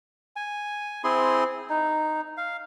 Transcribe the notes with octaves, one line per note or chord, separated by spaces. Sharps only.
G#5
C4 E4 G#4 C6
D#4
F5